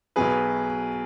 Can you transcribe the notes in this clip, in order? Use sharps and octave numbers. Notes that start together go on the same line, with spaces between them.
B1 B2 F#3 G#4 B4